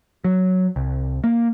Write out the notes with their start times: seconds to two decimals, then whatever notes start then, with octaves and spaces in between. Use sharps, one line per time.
0.24 F#3
0.76 C2
1.24 A#3